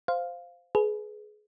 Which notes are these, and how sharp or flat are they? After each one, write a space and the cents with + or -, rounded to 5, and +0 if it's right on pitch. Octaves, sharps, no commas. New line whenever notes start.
C5 -5 F5 +0
G#4 +25 B4 +0